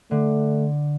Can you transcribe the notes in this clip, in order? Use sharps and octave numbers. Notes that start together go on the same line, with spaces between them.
D3 A3